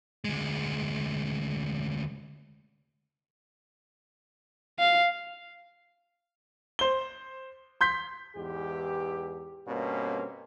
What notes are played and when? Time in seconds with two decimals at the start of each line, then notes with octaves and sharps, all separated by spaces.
0.24 D2 G#3
4.79 F5
6.79 C5 G7
7.81 C6 G6 B6
8.37 E2 G#2 E3 G4
9.68 G2 B2 A#3 C4 C#4